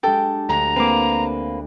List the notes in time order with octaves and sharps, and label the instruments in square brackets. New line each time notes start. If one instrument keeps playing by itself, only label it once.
[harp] G#3 D4 G4 [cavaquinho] A4 G5
[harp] D2 [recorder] A#5
[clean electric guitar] A#3 C4 [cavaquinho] B4 F5 D6